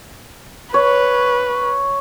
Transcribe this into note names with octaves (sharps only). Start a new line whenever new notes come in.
B4 C#5